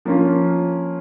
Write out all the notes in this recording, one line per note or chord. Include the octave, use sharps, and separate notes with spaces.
F3 A#3 C#4 F4